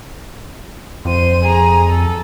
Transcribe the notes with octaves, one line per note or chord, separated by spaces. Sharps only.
F2 C5 D#7
G#4 A#5
A4